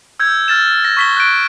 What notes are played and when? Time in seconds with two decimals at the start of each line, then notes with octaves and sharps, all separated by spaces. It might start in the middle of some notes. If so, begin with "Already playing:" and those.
0.20 E6 G6 G#6
0.48 F6 A6 E7
0.85 A#6
0.97 C#6 B6 G7
1.17 F#6 G6 D7